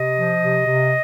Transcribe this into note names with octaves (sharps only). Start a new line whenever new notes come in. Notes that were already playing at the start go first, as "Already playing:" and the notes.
Already playing: C3 D#5
F3
C3
C3